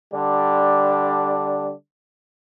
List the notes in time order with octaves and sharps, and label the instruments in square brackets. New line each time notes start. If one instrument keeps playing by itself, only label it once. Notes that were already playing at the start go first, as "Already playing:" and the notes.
[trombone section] D3 G3 D4